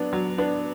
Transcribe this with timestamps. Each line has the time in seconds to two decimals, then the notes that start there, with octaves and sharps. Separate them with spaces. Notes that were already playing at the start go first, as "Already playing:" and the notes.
Already playing: F#3 B3 D4
0.13 F#3
0.38 B3 D4